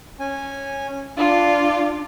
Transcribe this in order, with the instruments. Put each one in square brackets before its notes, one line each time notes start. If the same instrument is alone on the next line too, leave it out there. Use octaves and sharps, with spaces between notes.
[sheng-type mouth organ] C#4 G#5
[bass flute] D4 [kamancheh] F4 [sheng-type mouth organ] D5